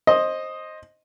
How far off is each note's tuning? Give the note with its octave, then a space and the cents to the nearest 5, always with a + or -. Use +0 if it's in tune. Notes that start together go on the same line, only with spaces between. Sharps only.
C5 +20 D#5 +0